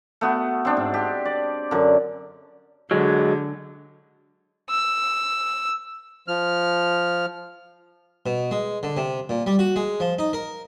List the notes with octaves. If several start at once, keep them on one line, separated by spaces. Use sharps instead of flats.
A3 B3 F#4
C4 D4
G#2
G4
D5
F#2 D3
D3 F#3 G#3
E6
F3 F6
B2
G#3
D3
C3
A#2
G3
F#4
G#3
F3
D#4
A#4